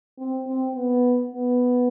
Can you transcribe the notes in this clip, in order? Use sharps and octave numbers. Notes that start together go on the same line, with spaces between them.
C4
C4
B3
B3